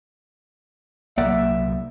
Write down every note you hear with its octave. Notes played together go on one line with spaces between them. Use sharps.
C2 F#3 A#3 D5 E5 F#5